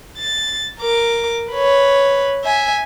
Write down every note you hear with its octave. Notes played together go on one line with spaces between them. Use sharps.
A6
A#4 D6
B4 C#5
E5 G#5